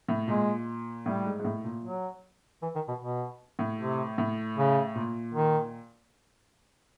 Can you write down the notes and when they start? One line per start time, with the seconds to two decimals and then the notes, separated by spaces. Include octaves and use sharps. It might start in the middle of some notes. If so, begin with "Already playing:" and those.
0.08 A2
0.28 A#2 G#3
1.06 A2 G3
1.25 G#2
1.39 G#2
1.44 A2
1.64 A#2
1.85 F#3
2.62 E3
2.75 D#3
2.88 B2
3.01 B2
3.59 A2
3.79 C3
4.18 A2
4.57 C#3
4.95 A#2
5.34 D#3